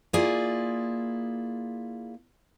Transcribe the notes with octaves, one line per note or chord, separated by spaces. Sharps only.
A#3 E4 F4 G#4 D5